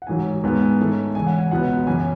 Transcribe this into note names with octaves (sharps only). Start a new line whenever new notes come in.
F#5
A1 G#2 D#3 F#3 G#5
G#2 D#3 G#3 B3
G#5
G#2 D#3 A3 C#4
E2 C#3 G#3 G#5
F#5
G#5
C#2 B2 F#3 B3 F#5
F#2 C#3 E3 G#5